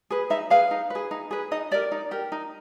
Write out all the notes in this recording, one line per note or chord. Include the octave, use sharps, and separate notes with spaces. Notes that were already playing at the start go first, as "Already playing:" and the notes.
G#4 B4
D#4 E5
G#4 B4 F5
D#4
G#4 B4
D#4
G#4 B4
D#4 D#5
G4 A#4 D5
D#4
G4 A#4
D#4